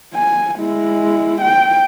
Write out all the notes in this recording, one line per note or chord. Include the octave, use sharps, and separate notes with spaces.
G#5
G#3 E4
G5